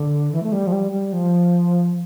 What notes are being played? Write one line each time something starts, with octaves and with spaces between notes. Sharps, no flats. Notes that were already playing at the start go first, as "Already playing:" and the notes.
Already playing: D3
E3
A3
G3
F3
G3
G3
F3